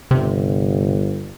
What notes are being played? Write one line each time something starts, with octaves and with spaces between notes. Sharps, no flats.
G1 C3